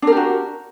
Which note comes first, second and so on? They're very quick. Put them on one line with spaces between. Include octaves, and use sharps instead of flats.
D4 A#4 G4 F#4